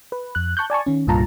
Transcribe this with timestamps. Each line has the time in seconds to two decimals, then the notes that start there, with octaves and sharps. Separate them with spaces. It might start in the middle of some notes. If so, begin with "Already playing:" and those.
0.12 B4
0.35 F2 F#6
0.57 A5 C#6 F#6 G6
0.70 D5 G#5 A5 C#6
0.86 D#3 C#4
1.07 C2 G2 A#2 F4 A5 A#5